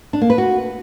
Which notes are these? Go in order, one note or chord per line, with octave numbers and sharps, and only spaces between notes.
D4
A#3
B4
F#4